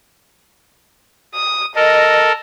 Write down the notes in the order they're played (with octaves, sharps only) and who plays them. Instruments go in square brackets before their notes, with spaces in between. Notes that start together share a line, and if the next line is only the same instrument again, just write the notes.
[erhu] D#6
[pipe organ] A4 A#4 [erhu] D#5